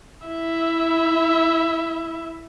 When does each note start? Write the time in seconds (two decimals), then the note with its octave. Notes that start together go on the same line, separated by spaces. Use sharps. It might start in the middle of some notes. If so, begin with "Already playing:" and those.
0.26 E4 E5